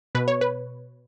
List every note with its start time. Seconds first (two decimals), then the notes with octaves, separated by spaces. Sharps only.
0.15 B2 B4
0.28 C#5
0.41 B4